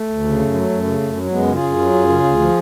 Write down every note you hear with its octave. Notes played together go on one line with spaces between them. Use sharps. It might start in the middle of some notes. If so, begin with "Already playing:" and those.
Already playing: A3
D2
C#3
F#2
F#3
F#2
C#3
F#2
F#3
F#2 G#3 B3
C#3
F4 G#4
F#2
F#3
F#2
C#3
D2
F3